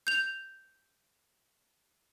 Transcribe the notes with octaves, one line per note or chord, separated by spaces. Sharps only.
G6 F7